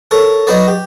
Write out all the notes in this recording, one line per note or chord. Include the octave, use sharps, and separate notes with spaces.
A4 A#4 C#5
F#3 D#4 F#4 B4 C#5 D5
G4